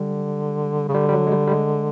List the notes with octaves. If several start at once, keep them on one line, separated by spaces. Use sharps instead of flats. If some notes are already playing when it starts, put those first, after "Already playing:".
Already playing: D3 G3
C#3
D3 G3
G3
F#3
G#3
G3
G3
G#3